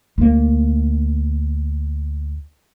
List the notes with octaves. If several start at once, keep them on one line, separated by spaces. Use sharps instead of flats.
D2 A#3